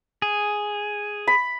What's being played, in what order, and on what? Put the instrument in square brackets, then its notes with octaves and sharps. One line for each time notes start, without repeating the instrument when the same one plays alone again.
[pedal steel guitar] G#4
[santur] B5